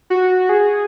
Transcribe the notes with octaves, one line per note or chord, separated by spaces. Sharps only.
F#4
G#4